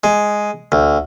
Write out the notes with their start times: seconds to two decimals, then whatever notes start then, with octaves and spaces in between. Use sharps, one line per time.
0.04 G#3
0.72 D2